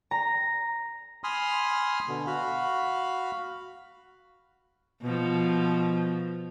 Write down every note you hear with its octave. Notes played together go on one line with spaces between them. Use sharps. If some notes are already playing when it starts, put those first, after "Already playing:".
A#5
G#5 B5 C6 D#6 F6
B2 D3
F#4 F5 B5
B2 F3